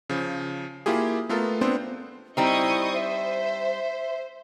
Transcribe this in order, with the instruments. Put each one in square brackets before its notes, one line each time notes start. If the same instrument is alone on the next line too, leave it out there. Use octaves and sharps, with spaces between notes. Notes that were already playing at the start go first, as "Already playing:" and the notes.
[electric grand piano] C#3 F3
A#3 E4 F4 G4 G#4
A3 B3 F4 A4 A#4
B3 C4 D4 C5
[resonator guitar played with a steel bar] G3 C4 D#4 [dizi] E4 [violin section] D#5 C#6 D#6
[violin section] C5 [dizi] E5